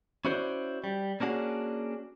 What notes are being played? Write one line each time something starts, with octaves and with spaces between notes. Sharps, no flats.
C#4 E4 F#4 C5 D5
G3
A#3 C#4 D4 F#4 G#4